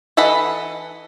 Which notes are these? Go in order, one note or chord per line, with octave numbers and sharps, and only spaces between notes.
E3 A4 D#5 F#5 B5